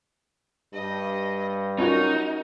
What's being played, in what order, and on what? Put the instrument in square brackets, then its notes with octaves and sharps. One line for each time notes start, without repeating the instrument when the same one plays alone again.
[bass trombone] G2 [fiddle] D#5
[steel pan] C#4 F4 F#4 [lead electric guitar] D#4 [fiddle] A#4